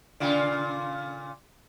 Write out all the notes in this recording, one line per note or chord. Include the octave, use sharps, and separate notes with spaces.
A#2 C#3 F4 D5 G#5